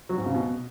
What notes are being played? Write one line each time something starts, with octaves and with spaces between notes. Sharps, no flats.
F#3
G#2
C#3
B2